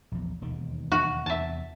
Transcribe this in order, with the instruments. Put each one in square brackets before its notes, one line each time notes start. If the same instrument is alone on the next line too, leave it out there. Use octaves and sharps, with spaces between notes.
[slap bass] A#1 E2
E1 D#2 D#3
[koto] F#4
[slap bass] E2 C3 [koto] E5 A5